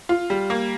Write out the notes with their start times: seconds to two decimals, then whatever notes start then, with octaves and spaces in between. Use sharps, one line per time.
0.09 F4
0.30 G3
0.50 A#3